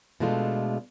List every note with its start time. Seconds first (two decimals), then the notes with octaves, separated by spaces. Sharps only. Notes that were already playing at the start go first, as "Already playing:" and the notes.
0.20 B2 G#3 A3 D4 F4 A4